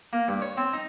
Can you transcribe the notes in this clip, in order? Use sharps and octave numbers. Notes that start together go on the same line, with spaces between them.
A#3
G2
C#5
C4
D#4